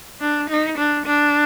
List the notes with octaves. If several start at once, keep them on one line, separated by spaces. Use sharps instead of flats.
D4
D#4
D4
D4